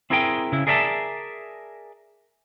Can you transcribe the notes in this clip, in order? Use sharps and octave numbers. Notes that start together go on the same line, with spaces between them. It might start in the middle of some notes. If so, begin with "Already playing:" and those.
C4 E4 G#4 A#4 D#5 G5
C#3 E4
G#4 A#4 D5 E5 F5 A5